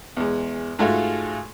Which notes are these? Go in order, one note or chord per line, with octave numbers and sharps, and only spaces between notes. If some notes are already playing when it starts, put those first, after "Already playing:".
E2 G#3
G#2 G#3 A3 F4 F#4